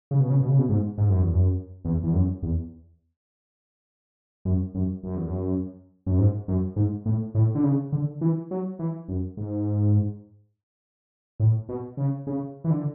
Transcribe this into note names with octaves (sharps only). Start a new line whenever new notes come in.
C#3
B2
C#3
B2
C#3
B2
G#2
G#2
F#2
E2
F#2
E2
E2
F#2
E2
F#2
F#2
F#2
E2
F#2
F#2
G#2
F#2
G#2
A2
A2
D3
C#3
D3
E3
F#3
E3
F#2
G#2
A2
B2
C#3
C#3
E3
D3